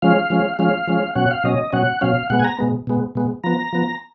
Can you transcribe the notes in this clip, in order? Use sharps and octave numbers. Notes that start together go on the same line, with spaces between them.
F3 G#3 C#4 F5
F3 G#3 C#4
F3 G#3 C#4 F5
F3 G#3 C#4
B2 F#3 C#4 F#5
F5
B2 F#3 C#4 D#5
B2 F#3 C#4 F#5
B2 F#3 C#4 F5
B2 G#3 B3 F#5
G#5
A#5
B2 G#3 B3
B2 G#3 B3
B2 G#3 B3
F3 B3 A#5
F3 B3